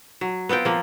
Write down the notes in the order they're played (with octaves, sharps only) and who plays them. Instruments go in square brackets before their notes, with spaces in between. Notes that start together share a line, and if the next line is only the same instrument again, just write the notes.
[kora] F#3
B3 C4 F4 G5
F3 A#3